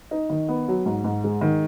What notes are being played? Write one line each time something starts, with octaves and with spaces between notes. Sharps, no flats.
D#4
D#3
B3
F#3
G#2
G#2
G#3
D#3